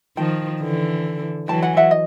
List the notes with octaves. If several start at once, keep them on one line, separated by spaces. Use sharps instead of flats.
D#3 F3 G5 A5
D3 E3
E3 F#3 G5 A5
F#5 G#5
E5 F#5
D#5